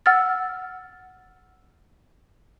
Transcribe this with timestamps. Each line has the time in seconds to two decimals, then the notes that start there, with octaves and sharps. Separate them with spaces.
0.06 F#5 E6 F6 A6